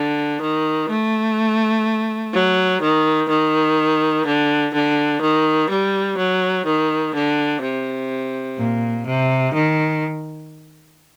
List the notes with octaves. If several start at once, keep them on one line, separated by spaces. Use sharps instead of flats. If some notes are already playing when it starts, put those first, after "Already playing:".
Already playing: D3
D#3
A3
F#3
D#3
D#3
D3
D3
D#3
G3
F#3
D#3
D3
C3
A#2
C3
D#3